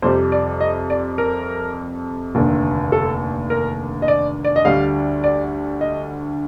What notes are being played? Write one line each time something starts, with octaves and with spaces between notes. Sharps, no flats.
F2 C3 G3 C5
D5
D#5
D5
A#4
F1 D#2 D3
A4
A#4
D#5
D5
D5
D#5
D2 D3 G3 F5
D5
D#5